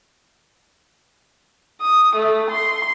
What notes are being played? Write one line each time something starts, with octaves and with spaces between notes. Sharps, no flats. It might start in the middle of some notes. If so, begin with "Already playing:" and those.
D#6
A3
C6